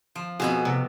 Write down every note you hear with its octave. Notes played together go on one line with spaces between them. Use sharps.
F3
F2 B2 F#4 G#4 B5
C3